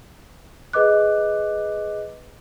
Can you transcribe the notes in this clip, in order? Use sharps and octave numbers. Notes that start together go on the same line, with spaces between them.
G#4 B4 D#5 D6 F#6